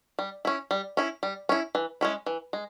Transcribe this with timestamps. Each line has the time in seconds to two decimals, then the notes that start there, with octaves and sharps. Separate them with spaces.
0.19 G3
0.45 C#4 E4
0.71 G3
0.97 C#4 E4
1.23 G3
1.49 C#4 E4
1.75 E3
2.01 G#3 C#4 E4
2.26 E3
2.53 G#3